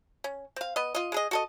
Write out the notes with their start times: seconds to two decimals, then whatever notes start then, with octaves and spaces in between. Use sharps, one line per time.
0.24 C#4
0.56 C4 F5
0.76 B3 D#5
0.95 F4 D#5
1.12 G#3 G#4 D#5
1.31 F#4 A4 D#5